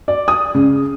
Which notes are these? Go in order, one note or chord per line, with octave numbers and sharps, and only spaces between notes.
D5
D#6
C#3